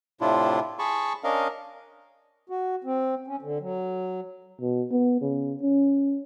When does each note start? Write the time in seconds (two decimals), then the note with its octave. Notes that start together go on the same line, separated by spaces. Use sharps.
0.21 A2 C3 D4 E4 F4
0.79 G#4 A5 B5 C#6
1.24 C#4 D4 A#4 D#5 F5
2.49 F#4
2.84 C4
3.27 C#4
3.42 D3
3.60 F#3
4.61 B2
4.91 B3
5.21 C#3
5.62 C#4